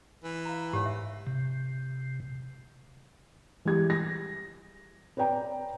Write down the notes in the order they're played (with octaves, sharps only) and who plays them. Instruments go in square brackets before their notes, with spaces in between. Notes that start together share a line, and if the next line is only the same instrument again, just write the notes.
[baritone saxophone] E3
[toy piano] F5 A#5
[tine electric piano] G#2 [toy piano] G4 C#5
[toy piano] E5
[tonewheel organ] C3
[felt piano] E3 G3 G#3 G4 G#6
A#6
B4 C#5 D5 G5 A#5